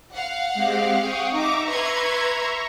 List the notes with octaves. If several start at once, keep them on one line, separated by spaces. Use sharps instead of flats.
F5 F#5
G#3 C4 G4
G5 C#6 D#6
D#4 E5 A#5 C#6 D6
B4 C6 G#6